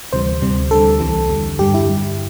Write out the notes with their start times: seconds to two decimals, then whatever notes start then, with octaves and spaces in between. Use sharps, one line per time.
0.12 D2 C3 E3 G3 C5
0.42 D2 C3 G3
0.71 D2 D3 G3 A4
1.00 C2 C3 E3
1.30 E2 D3 G3
1.59 G2 D3 G3 G4
1.74 E4
1.88 G2 G3